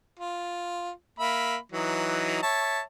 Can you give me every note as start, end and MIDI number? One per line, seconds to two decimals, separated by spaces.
0.19 0.90 65
1.19 1.56 58
1.19 1.56 76
1.19 1.56 83
1.72 2.38 52
1.72 2.38 54
1.72 2.38 63
2.42 2.81 73
2.42 2.81 76
2.42 2.81 81